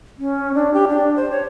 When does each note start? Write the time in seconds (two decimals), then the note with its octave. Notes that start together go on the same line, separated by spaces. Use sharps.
0.18 C#4
0.55 D4
0.74 G4
0.88 D4
1.16 C5
1.31 C#5